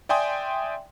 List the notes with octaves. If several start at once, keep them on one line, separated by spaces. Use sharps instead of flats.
D5 E5 G5 G#5 C6 D#6